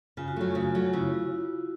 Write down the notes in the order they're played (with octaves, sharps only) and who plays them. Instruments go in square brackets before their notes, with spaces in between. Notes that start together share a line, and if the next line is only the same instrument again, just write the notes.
[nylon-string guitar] C#3 [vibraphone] F4
[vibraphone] F#4
[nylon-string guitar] F#3 A3 [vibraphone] F4
[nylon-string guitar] C#3 [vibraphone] F#4
[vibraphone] F4
[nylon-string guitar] F#3 A3
[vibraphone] F4
[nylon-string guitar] C#3 [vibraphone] E4 F#4